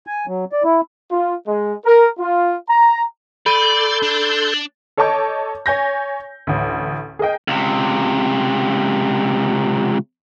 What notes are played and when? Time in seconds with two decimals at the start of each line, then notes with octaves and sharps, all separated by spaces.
0.07 G#5
0.27 F#3
0.52 D5
0.64 E4
1.11 F4
1.47 G#3
1.85 A#4
2.18 F4
2.69 A#5
3.46 A4 D5 B5 C6 G6 D#7
4.03 D4
4.97 A4 C#5 D#5 A5 D6 G6
5.66 C#5 G#5 G6 A#6
6.47 A1 D2
7.19 G#4 A#4 D#5 G5
7.48 C#2 C3